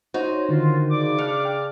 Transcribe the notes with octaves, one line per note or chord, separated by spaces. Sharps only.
D#4 F#4 C5 C#5
D3 D#3 F4
C#3 D5 D6
D4 F6 F#6 C#7
G5